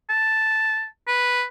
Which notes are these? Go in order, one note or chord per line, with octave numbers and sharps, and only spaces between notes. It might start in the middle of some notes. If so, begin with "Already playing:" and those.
A5
B4